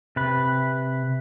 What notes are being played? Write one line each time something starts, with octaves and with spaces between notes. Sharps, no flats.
C3 B4